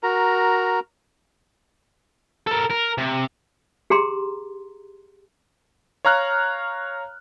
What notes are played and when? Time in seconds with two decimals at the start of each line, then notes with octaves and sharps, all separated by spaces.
0.03 F#4 A#4 A#5
2.47 A4 A#4
2.70 A#4
2.98 C3
3.90 G4 G#4 A#5 C6
6.05 C#5 F5 A#5 F6 F#6